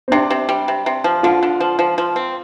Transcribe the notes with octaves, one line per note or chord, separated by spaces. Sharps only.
C4
C3 D4
C3
G3
C3
C3
F3
D3 F4
D3
F3
F3
F3
C4